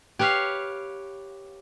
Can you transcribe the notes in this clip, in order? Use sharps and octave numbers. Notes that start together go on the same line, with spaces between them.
G4 B4 C#5 F5